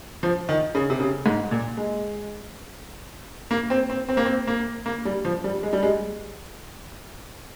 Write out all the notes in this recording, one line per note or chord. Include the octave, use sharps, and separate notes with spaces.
F3
D#3
C#3
C3
C#3
G#2
A#2
G#3
A#3
C4
C4
C4
A#3
C4
A#3
A#3
G3
F3
G3
G#3
G3
G#3